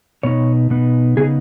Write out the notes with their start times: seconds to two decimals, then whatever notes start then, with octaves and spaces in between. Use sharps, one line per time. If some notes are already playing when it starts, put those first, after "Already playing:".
0.23 B2 B3 D#4 C#5
0.70 B2 B3 D#4
1.17 C#3 B3 D#4 G#4